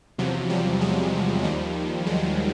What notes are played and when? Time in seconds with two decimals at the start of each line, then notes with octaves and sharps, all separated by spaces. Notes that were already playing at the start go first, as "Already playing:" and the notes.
0.18 E2 C3 F3 F#3
0.50 F3 G3
0.81 F#3 G#3
1.43 D#2 D#3 F3 G3
2.06 F#3 G#3